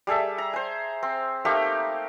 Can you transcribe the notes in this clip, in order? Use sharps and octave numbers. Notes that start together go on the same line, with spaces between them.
G3 G#4 A4 E5
A#5
C5 G#5
C4
A3 A#3 D#4 G4